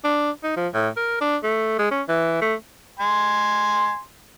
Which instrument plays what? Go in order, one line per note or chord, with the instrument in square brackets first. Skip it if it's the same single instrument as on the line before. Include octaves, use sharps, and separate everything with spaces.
[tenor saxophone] D4
D#4
F3
A2
A#4
D4
A3
G#3
C#4
E3
A3
[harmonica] G#5 C6